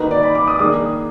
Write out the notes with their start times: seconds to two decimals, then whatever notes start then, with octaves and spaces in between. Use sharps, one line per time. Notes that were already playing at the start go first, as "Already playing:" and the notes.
Already playing: D#3 A#3 D#4 F#4 A#4 B4
0.11 D5
0.23 B5
0.35 D6
0.48 D#6
0.59 D#3 A#3 D4 G#4 D#6